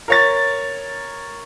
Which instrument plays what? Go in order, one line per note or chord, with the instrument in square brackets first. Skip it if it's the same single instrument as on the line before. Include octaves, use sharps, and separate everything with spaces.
[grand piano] A#4 C#5 A6